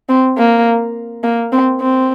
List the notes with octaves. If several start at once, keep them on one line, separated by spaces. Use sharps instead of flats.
C4
A#3
A#3
C4
C4